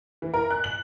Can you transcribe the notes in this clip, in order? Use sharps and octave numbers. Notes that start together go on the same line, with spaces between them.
E3
A#4
F#6
F#7